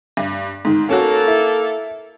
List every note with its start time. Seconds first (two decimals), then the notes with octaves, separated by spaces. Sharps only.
0.17 G2
0.65 G#2 D#3
0.89 A#3 C#4 F#4 A4
1.28 E4